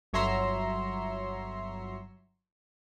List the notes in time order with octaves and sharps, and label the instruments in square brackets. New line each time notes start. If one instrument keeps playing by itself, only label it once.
[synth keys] G1 F#3 C#5 E5 A#5 C6